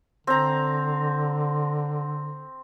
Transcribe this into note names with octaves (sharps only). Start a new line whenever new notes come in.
D3 C4 A#5